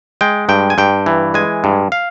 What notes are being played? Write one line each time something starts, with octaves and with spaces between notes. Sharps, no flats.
G#3 G5
G2 G5
G#5
G2 G5
E3
G#3 G#5
G2
F5